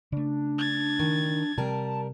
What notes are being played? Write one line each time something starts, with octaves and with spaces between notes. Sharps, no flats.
C#3 A3 D4
G#6 A6
D#3
C3 G3 C4 A#4 A5